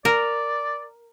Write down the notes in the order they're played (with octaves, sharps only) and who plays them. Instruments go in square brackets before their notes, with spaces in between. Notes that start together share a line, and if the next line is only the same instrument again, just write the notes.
[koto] A#4 [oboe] D5